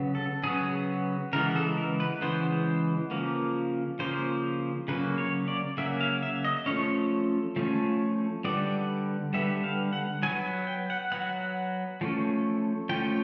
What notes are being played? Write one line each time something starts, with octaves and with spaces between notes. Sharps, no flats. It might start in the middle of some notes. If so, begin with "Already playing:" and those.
Already playing: C#3 F#3 B3
A4
C#3 F#3 B3 G#4
C#3 E3 G#3 B3 A#4
A4
A#4
B4
C#3 E3 G#3 B3 C5
C#3 F3 A#3
C#3 F3 A#3 C5
C#3 F#3 A#3 B4
C#5
D5
C#3 F#3 A#3 E5
F5
E5
D#5
F3 A3 C#4 C#5
F3 A3 C#4
D3 G3 B3 D5
D3 G3 B3 E5
F5
F#5
F#3 B3 G#5
G5
F#5
F#3 B3 F#5
F3 A3 C#4
F3 A3 C#4 G5